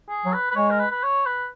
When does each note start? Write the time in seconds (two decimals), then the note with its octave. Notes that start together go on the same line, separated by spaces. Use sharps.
0.09 G#4
0.25 F#3
0.33 B4
0.51 B4
0.55 G#3 C#5
0.70 A#4
0.80 B4
0.91 B4
1.03 C#5
1.26 B4